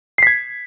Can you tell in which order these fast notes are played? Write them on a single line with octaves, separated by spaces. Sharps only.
C7 B6 G#6